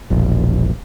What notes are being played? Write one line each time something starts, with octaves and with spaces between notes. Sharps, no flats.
E1 A#1